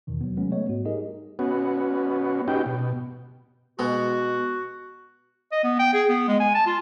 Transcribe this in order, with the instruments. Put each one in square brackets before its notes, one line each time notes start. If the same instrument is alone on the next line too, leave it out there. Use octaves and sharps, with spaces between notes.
[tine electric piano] E2 B2 D#3 E3
F#3 B3
C3 F#3 G#3 A3 B3 C#4
G3 A3 B3 C#5 D#5
G#2 F#4
G3 D#4 G4 G#4 A#4 D#5
[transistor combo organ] B3 C#4 F#4
B3 C#4 D#4 F#4 G4 G5
B2
[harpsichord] B2 G#3 [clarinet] F#4
[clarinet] D#5
B3
G5
G#4
B3
G#3
G#5
A5
F4